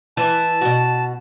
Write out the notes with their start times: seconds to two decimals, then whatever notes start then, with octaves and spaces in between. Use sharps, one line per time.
0.17 E3 A5
0.61 B2 F#4